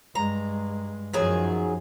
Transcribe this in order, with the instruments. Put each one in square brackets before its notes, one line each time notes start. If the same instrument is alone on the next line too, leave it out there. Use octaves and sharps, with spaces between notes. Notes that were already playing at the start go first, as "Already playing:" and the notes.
[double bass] G2 G#3 [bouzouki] A#5
[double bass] F#2 F3 [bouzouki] D#3 F#3 G#4